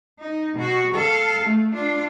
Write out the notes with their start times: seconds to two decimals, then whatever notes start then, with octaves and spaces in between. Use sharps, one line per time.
0.19 D#4
0.55 B2 F#4
0.94 A4 F5
1.44 A3
1.74 D4 F4